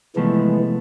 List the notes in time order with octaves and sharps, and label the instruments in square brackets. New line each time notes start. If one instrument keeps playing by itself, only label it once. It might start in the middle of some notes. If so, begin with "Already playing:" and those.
[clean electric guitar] C2 F3 A3 [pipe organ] E3 G#3 B3